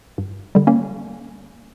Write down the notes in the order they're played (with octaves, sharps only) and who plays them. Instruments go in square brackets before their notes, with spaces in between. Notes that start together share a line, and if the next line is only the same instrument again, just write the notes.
[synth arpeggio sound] G2
D3 G3
A#3 C#4